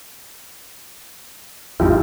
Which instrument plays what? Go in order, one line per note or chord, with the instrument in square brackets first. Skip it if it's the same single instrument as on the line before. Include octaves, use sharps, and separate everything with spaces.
[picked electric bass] G#1 F2 G#2 [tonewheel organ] E4 F4 G4